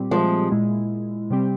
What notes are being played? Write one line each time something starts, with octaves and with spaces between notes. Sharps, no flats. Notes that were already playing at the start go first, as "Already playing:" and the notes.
Already playing: A#2 G3 C4 G4
F3 G#3
A#2 G#3 E4
C3 G3 C4 G4